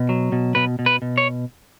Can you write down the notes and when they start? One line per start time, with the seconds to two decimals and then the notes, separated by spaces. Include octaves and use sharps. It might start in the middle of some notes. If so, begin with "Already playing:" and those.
Already playing: B2
0.09 F#3
0.32 B2
0.55 B2 B4
0.79 B2
0.86 B4
1.02 B2
1.18 C#5